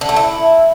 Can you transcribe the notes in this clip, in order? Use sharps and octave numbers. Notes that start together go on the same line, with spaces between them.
D3
A3
E4